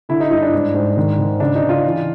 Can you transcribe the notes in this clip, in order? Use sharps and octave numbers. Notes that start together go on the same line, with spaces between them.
D3 E4
D#4
G2 D#4
D4
G#2
G#2
D#3
D#3
C#3 D4
D#4
C#3
F4
E3